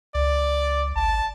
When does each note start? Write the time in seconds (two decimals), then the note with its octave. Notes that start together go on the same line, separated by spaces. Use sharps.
0.15 C#2 D5
0.96 G#1 A5